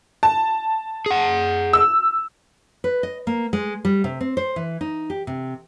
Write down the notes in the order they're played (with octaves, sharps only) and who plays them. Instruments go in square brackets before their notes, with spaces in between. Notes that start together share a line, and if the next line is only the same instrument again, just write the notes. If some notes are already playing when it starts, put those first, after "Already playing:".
[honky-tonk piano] A5
[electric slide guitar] G#4 F#5
[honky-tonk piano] E6
[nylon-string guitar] B4
D#5
A#3
G#3
G3
C3
C4
C5
E3
D#4
G4
C3